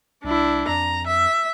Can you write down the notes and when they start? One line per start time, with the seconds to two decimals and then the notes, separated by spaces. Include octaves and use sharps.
0.24 C2 D4 E4
0.68 F2 A#5
1.07 E5